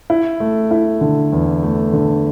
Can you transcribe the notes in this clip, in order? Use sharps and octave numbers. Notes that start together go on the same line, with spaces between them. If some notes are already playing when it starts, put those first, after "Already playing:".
E4
A3
E4
D3
E2
A3
D3